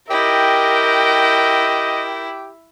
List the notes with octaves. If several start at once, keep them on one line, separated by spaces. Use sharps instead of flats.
E4 G4 A#4 D#5 G5